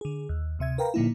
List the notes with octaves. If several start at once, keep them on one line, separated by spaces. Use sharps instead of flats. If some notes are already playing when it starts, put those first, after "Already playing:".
D3 G#4
D#2
D2 C3 E5 G#6
A#4 B4 F5 G5 A#5
A#2 D3 F3 A#3 D#4 E4